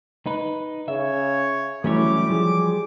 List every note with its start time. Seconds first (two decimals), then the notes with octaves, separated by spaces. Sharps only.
0.26 D#4 B4
0.88 C#3 C#5 E5
1.84 E3 F#3 G3 A3 C#4 E4 C#5 D6
2.30 F3 G#4